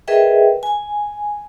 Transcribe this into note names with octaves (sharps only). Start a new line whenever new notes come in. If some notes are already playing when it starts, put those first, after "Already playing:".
G#4 A#4 B4 D#5 E5 G5
G#5